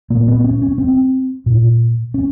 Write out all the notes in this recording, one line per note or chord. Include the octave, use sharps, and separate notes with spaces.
A#2 A#3
B3
C#4
C#4
C4
A#2
C#4